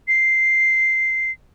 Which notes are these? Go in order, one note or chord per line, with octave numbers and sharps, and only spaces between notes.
C7